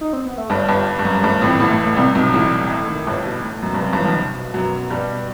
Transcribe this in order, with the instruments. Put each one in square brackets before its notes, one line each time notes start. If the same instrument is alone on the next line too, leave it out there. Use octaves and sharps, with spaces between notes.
[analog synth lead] D#4
C4
B3
A3
[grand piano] G1 G2 [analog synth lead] G3
[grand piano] G1 G2
G2
F#2
[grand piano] G1 G2 [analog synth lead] A3
[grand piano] A1 A2 [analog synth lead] C4
[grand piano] A1 A2 [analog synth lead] B3
[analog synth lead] A3
A3
[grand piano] C2 C3 [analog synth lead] G3
[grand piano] B1 B2
A1 A2
[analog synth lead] A3
D#3
[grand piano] G1 G2 [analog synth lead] C3
[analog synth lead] B2
A2
[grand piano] F#2 [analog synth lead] B2
[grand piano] G2
[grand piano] F#2 [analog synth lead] C3
[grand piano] G1 G2
[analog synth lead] E3
[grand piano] B1 B2
[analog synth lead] C3
B2
[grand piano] F#2 F#3
G2 G3